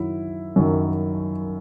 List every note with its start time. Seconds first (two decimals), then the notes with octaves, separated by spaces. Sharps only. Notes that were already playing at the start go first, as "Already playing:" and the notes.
Already playing: F#2 D#3 F#3 E4
0.56 F#2 D#3 F#3